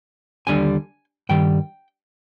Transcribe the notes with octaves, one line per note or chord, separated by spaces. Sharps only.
D#2 D3 G3 D4 G#5
G2 D#3 G3 G5